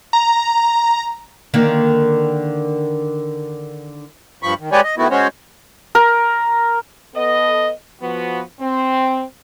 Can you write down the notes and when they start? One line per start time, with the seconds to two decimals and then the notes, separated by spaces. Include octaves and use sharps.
0.13 A#5
1.54 D3 D#3 A#3
4.43 G2 F3 B5 C#6
4.60 D#3
4.72 G#3 G4 B4 C#5 D5 G#5
4.84 D#5
4.98 D#3 A3 B3 E4 F#4
5.11 G#3 C#4 F#4 C5 C#5
5.95 A#4
7.15 B3 A4 D#5
8.00 F3 B3 F#4
8.60 C4